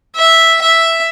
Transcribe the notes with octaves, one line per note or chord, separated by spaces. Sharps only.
E5
E5